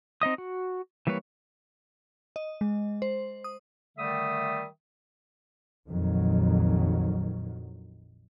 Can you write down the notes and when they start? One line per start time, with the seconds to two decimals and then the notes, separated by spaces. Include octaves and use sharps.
0.22 C4 D#4 D#5 D#6
0.38 F#4
1.07 E3 G3 A#3 B4 C#5
2.36 D#5
2.61 G#3
3.02 C5
3.44 D#6
3.97 D3 D#3 G3 A3 E5 D#6
5.87 A#1 F2 D#3 F#3